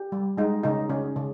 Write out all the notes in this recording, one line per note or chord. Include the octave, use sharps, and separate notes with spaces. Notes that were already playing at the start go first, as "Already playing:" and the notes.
Already playing: G4
G3
G#3 D#4
C#3 D#4
C#3 C#4
C#3